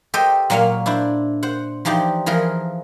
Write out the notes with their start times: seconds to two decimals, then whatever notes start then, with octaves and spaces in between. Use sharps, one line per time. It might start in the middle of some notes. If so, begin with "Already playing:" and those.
0.14 G4 A4 C5 D#5 G5
0.50 A#2 F#3 A#3 C#5 F5
0.86 D4 E4 C5 D5
1.43 C5 F#5
1.85 E3 F3 D#4 G4 C5 D5
2.26 E3 F3 G#4 A#4